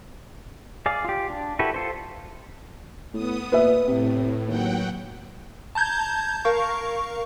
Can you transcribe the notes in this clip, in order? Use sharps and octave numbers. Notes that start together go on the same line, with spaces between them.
G#4 D5 F5
F4 G4
D4
E4 F#4 G4 A4 B4
F4 A4 C5
A2 B3 D#6
A#2 B4 E5
A2 C3
D#2 F#3 F#5 G5
A5 A#5 G6 G#6
A#4 F5 C#6